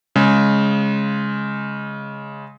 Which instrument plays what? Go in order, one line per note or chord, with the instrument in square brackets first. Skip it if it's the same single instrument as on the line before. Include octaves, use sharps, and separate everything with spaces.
[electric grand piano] C#3 G#3